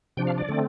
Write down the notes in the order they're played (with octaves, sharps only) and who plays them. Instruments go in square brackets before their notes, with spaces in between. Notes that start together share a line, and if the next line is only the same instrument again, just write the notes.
[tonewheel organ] C3 F3 D4 G5
F5
D5
D3 A3 C4